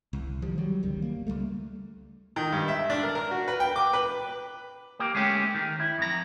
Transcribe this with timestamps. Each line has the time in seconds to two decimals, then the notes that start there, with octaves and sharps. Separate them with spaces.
0.13 C2
0.42 D#3 F3 G3
0.58 F#3 G3
0.83 G1 C#2 D#3 G3
1.02 A#3
1.27 C#2 F#2 G3 A3
2.36 D#3
2.52 G2
2.68 E5
2.90 D4
3.03 A#4
3.15 A#4
3.31 F#4
3.48 B4
3.60 G5
3.76 D6
3.93 B4
4.99 A#3 G4
5.15 G#3 A3 C#4 G4
5.54 D#3
5.80 E4
5.98 F2 A#5